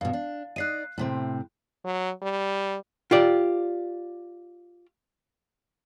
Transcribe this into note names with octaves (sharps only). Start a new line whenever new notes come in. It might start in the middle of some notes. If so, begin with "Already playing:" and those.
G2 B2 F5
D4
D#4 D5 D#5 F#6 C7 D#7
A2 C3 C4
F#3
G3
F4 G4 D5